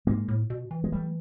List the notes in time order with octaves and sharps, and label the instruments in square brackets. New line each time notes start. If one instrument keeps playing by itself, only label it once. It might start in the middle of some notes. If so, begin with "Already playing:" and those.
[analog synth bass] G#2 [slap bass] G#3 A#3
[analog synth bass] A2
B2
E3
[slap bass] G#3
G3 A3